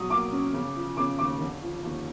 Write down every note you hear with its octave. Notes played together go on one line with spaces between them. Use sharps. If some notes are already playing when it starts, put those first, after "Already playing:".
Already playing: B2 F#3 D#6
A#3 D6
C#4
C#3
F3
C#3 D6
D#2 D6
D3
F3
D#2